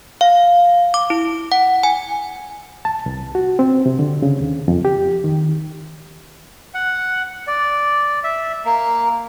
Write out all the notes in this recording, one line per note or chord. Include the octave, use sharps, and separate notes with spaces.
F5
D6
E4
F#5
G#5
A5
C2
F#4
C4
C3
D3
C#3
D#2
F2
G4
D#3
F#5
D5
E5
A#3